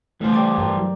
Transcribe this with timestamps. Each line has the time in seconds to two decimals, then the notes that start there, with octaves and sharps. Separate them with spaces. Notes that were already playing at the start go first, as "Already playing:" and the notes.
0.21 C#3 E3 G3 A3 C5
0.34 A3 G4 D5 A5 C#6 D6
0.58 G2 G4 A#4 D5
0.77 F#3